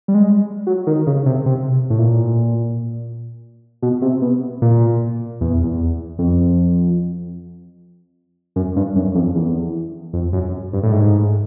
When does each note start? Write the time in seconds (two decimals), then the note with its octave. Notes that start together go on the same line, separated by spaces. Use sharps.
0.08 G3
0.14 G#3
0.67 F#3
0.87 D#3
1.07 C#3
1.26 C3
1.46 C3
1.90 A2
1.99 A#2
3.82 B2
4.02 C3
4.22 B2
4.62 A#2
5.41 E2
5.64 E2
6.19 F2
8.56 F#2
8.76 G2
8.96 F#2
9.15 F2
9.35 E2
10.13 F2
10.33 F#2
10.73 G2
10.83 A2
10.92 G#2